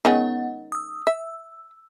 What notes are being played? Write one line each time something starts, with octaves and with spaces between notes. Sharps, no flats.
D#3 G#3 B3 C#4 D#5 F#5
D#6 E6
E5 E6